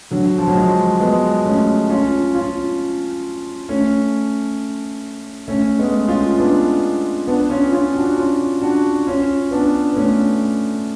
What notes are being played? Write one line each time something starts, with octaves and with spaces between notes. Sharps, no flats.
D3 F#3
F3
F#3
F3 G#3
G#3 B3
A3 C#4
C#4 F4
C#4 F4
A3 C#4
A3 C#4
G#3 B3
C#4 F4
B3 D4
B3 D4
C#4 F4
C#4 F4
D4 F#4
C#4 F4
D4 F#4
C#4 F4
B3 D4
B3
A3 C#4